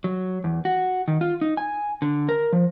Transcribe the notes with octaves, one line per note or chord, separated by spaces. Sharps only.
F#3
E2
F#4
D#3
F4
D#4
G#5
D3
A#4
F3